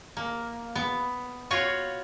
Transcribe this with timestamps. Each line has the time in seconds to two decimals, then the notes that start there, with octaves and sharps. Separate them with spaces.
0.17 A#3
0.75 B3
1.51 F4 F#4 C#5